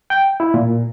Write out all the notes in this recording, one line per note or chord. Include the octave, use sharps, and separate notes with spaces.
G5
E4
A#2